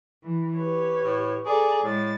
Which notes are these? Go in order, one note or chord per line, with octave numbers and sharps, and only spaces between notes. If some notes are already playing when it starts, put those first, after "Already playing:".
E3
G4 B4 C#5
A2
G#4 A4 D5 A#5
A2 G#3 A6